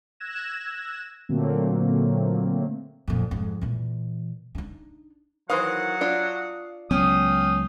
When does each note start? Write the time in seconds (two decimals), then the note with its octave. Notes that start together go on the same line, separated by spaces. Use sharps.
0.20 E6 F#6 G#6 A#6 E7
1.29 A#2 D3 F#3 A3 A#3 C4
3.08 F2 A#2
3.31 F2 G#2
3.61 A#2 E3
4.55 D4 D#4
5.50 D#3 E3 F#3 C5 F5 F#5 D#6
6.01 D4 F4
6.91 C#2 F#3 B3 C#4 F5 G5 D#6